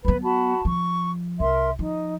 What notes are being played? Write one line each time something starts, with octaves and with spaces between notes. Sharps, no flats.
F#3 B3 B4 B5
F#4 A5 B5
F3 C#6
C2 A#4 E5 C6
F3 D#4